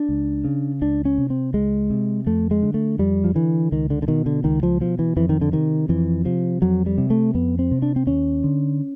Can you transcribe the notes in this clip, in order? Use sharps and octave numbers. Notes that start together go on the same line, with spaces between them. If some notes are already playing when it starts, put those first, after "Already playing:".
Already playing: D4
C#2
C#3
C#2 D4
C#4
C3
C4
C#2 G#3
C3
F2 A3
G#3
D3
A3
F2 G3
F3
D3 E3
C#2 D#3
D3
D3
B2 D#3
D3
C#2 D#3
F3
B2 F3
E3
F2 E3
D#3
D3
C3 D#3
F2 E3
C3 F3
F2 F#3
G3
C3
A3
F2 B3
C4
C3
D4
C4
D#2 C#4
D3